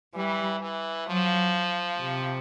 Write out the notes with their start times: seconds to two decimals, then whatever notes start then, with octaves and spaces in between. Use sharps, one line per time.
0.14 E3 G3
0.60 E3
1.07 F3 F#3
2.00 C3